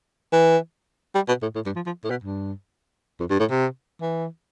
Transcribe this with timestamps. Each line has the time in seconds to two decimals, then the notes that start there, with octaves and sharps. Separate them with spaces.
0.32 E3
1.15 G3
1.28 B2
1.42 A2
1.55 A2
1.66 G2
1.76 F3
1.86 F3
2.04 A2
2.10 B2
2.24 G2
3.20 F2
3.30 G2
3.40 A2
3.50 C3
4.01 E3